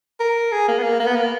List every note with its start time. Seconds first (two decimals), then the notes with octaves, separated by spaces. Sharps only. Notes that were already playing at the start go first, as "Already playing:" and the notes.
0.20 A#4
0.52 G#4
0.68 A#3
0.79 B3
0.83 A#3
1.00 A#3
1.07 B3
1.16 A#3